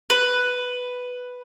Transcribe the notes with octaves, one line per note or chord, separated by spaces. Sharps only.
B4